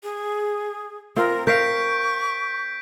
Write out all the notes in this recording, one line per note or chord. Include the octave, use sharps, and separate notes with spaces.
G#4
C4 F4 A#4
A#4 F5 C#6 G6 B6 D7